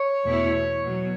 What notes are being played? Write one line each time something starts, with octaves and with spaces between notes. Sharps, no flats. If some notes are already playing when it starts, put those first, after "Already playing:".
Already playing: C#5
E2 B2 A3 E4
B2 F#3